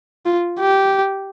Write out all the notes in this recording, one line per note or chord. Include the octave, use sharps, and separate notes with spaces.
F4
G4